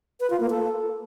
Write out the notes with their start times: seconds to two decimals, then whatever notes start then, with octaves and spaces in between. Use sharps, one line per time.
0.20 B4
0.30 F4
0.40 A#3
0.50 A4